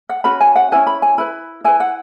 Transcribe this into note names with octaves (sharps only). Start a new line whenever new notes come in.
F#5
C#4 F#4 B4 B5
G#5
F#5
C#4 E4 B4 G#5
B5
G#5
E4 B4 B5
E4 B4 G#5
F#5